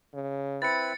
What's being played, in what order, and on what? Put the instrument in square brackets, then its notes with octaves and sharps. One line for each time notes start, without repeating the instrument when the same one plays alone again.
[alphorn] C#3
[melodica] C4 E4 B4 [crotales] A6 C#7